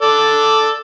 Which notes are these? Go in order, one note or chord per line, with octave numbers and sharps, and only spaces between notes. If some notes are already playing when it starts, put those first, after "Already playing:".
A4 D5